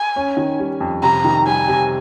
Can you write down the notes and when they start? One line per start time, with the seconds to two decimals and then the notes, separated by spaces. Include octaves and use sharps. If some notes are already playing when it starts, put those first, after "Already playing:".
Already playing: G#5
0.16 C#4
0.37 D#3
0.59 G3
0.80 F2
1.02 C3 A#5
1.24 D#3
1.46 G3 G#5
1.68 C3